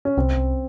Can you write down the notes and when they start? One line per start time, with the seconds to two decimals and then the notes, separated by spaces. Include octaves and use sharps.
0.05 C#4
0.17 C2 C4
0.37 C2